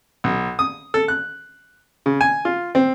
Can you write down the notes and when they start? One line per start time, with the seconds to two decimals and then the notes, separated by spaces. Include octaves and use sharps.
0.24 B1
0.59 D#6
0.94 A4
1.08 F#6
2.06 C#3
2.21 G#5
2.45 F4
2.75 C4